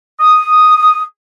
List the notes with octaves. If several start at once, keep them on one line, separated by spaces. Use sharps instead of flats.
D#6